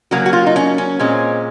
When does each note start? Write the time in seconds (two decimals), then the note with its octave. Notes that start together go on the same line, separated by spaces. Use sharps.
0.11 C#3 F#3 A#3 F#4
0.26 F#4
0.33 F4
0.46 D#4
0.56 C#4
0.78 C#4
0.99 A#2 G#3 C4 C#4